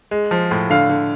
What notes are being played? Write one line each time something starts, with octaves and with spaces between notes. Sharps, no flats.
G#3
F3
A2
D3 F5
D3